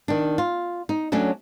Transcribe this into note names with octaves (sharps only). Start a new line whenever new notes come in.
D#3 D4
F4
D#4
F#3 A3 C#4 D4